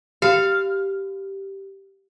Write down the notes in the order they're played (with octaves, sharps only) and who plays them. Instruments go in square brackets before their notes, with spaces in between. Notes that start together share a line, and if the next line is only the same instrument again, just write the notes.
[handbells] G4 [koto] F5